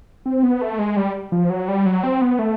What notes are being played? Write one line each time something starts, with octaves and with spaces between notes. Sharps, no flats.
C4
B3
A3
G#3
G3
F3
F#3
G3
F#3
C4
B3
A3